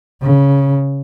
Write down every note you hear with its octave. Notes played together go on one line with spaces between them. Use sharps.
C#3